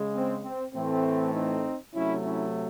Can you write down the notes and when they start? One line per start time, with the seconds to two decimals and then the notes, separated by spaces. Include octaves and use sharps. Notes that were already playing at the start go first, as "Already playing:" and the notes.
Already playing: C#3 G#3
0.14 C4
0.43 C4
0.74 A2 E3 A3 C4
1.34 C4 D#4
1.94 C3 F#3 A3 C#4 E4
2.24 C#4 E4